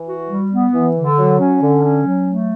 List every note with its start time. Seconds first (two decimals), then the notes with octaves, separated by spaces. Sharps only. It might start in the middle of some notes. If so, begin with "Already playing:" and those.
Already playing: E3
0.08 F#4
0.30 G3
0.52 B3
0.73 E3
0.96 D3
1.18 F#3
1.40 C#4
1.62 D3
1.83 C#4
2.05 F#3
2.27 A3